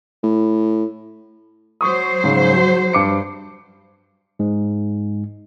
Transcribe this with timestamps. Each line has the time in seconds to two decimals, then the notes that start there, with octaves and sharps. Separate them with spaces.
0.23 A2
1.81 F#3 C5 C#6 D#6
2.24 G#2 C#3
2.57 F#4
2.93 G2 D6 C#7
4.39 G#2 G#3